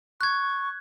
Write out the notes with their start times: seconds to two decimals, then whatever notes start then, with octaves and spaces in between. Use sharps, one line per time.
0.21 C#6 F#6 G#6